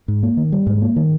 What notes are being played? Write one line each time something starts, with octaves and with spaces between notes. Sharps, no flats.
G#2
A#3
D#3
G3
G#2
A#3
D#3